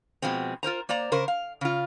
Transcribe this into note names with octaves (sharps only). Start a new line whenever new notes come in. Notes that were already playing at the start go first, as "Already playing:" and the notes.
B2 F3 G#3 C4
F4 A#4 C5 A#5
A#3 C5 D5 A#5
C#3 A#4 C5
F5
C#3 F4